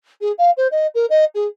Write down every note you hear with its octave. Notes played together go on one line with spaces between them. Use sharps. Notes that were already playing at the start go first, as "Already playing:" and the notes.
G#4
F5
C5
D#5
A#4
D#5
G#4